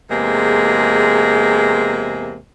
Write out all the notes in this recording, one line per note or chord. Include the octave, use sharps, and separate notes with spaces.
E2 C3 G#3 A#3 G#4